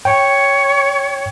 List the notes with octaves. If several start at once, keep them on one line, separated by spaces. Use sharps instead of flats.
C#5 G5